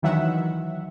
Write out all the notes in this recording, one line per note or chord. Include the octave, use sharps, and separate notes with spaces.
D2 D#3 E3 F#3 E5 F#5